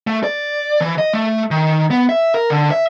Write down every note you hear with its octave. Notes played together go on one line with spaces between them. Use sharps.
A3
D5
E3
D#5
A3
D#3
B3
E5
A#4
D3
E5